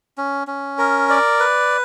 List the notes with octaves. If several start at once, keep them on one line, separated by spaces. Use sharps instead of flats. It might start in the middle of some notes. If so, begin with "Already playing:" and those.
C#4
C#4
A#4
D5
B4